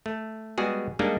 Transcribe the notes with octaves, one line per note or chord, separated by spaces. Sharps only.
A3
G3 G#3 B3 F#4 G#4
G3 G#3 A#3 D4 D#4